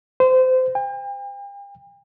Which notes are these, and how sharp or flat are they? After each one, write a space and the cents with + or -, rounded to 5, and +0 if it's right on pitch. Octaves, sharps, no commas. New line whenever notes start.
C5 -25
G5 +40